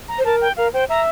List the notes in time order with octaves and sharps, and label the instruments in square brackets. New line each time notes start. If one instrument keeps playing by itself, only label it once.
[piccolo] A#5
[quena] C5
[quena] A#4 [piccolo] A5
[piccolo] G5
[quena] A#4 [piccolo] F5
[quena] C5 [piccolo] G5
[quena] E5 [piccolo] A#5